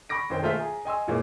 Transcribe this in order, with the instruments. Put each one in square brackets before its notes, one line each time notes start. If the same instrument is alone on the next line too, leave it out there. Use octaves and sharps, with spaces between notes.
[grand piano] B5 C#6 D6 A#6 D7
F#2 D#3 C5 G5
G#3 A3 F4 C5 E5
G#4 A#5
D#5 G#5 C6 E6
F#2 A#2 E3 G#3 A#3 C#4